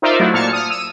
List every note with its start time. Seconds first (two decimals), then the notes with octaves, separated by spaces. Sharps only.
0.02 D#4 F4 A#4 C5 D5 E5
0.20 F#3 A3 D4 E4
0.33 A#2 A5 F6 G#6 C#7
0.53 D#6 F6
0.70 E6 D#7